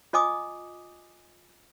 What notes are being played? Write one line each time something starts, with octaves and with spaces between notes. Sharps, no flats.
F4 D#5 G#5 D6 D#6